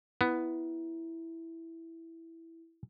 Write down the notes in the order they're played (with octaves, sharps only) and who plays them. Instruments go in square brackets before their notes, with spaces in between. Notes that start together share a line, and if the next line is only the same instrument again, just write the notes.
[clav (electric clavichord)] B3 [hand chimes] E4